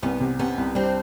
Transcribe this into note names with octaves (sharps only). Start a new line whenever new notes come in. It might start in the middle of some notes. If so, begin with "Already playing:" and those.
C2 B3 C#4
C3
C3 B3 C#4
C2
G3 C4 D4